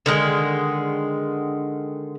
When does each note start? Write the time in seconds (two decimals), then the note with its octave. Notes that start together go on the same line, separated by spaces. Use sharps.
0.06 D3 D#3 G#3